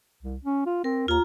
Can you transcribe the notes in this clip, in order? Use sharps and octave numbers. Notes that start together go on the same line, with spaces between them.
C2
C#4
F4
C4 A#4
D#2 F4 A#5